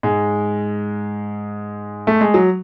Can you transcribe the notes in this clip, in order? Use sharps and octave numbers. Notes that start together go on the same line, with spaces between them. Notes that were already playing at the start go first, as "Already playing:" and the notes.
G#2 G#3
A3
G#3
F#3